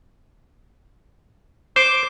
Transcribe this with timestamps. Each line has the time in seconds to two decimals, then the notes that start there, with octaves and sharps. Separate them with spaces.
1.76 C5 D6